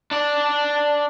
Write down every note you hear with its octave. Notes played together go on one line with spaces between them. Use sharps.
D4 D5